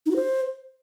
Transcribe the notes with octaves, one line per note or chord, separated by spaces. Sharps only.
D#4
F#4
C5